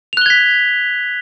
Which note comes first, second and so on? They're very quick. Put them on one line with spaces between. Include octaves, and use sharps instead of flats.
F7 F#6 G7 G#6 B6